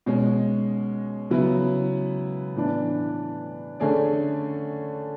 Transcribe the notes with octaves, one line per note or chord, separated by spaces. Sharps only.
B2 G#3 C#4
C#3 F#3 B3 E4
A2 E3 B3 D4
D3 A3 C#4 G#4 D5